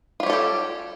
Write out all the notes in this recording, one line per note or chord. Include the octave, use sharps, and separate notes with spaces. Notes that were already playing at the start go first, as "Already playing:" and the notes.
G3 F4 G4 A4 C#5